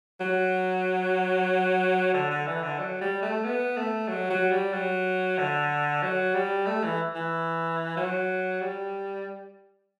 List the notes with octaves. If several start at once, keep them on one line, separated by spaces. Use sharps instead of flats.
F#3
D3
D3
E3
D3
F#3
G3
A3
B3
A3
F#3
F#3
G3
F#3
D3
F#3
G3
A3
E3
E3
F#3
G3